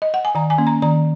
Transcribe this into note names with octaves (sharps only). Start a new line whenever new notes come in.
D#5
F#5
G#5
D#3 A#5
G#5
A#3 C#4
A#5
D#3 A#5